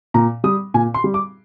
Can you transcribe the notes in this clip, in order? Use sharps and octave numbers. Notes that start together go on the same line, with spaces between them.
A#2 A#5
G3 D#6
A#2 G#5
C6
G3
D6